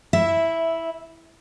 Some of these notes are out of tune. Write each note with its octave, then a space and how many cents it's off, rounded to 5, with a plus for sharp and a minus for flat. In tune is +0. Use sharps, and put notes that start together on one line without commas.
E4 -10 E5 +0